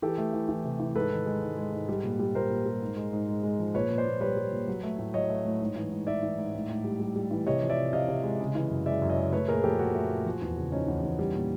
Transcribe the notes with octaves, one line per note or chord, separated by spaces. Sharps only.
E3 G4 A4
A3
E3
E3
C3
E3
G#2 A4 B4
D#3
G#3
G#2
G#3
G#2
G3
A#2
G3
A#2 A#4 C5
A#2
G3
G#2
G#3
G#2
G#3
G#3
F3
A#2 B4 C#5
A#2
C5 D5
A#2
G3 B4 C#5
G3
A#2
F#3
A3
A2
F#3 C#5 D#5
A3
A2
G#2
E3
G#2
E3 D5 E5
E3
G#2
A2
A2
G3
G3
G3
E3
C3 C#5 D#5
F3
D5 E5
C3
C3 D#5 F5
C3
G#3
C#3
E3
F#2
G#3 D5 E5
F#2
C#5 D#5
C#3
A3 B4 C#5
A#2 G#4 A#4
F3 G4 A4
A3 F#4 G#4
A3
A#2
F3
E2
C#3
F3 C#4 D#4
E2
E2
G3
A#2